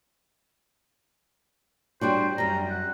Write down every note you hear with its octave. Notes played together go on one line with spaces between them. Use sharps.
G3 D4 F#4 C5
F#2 G3 A#5
F#5